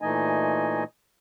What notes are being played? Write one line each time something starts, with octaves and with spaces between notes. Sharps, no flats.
A#2 E3 A3 D#4 D#5 G#5